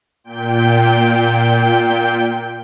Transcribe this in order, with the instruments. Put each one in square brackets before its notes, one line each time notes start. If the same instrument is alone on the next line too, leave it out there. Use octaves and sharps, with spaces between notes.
[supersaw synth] A#2 G5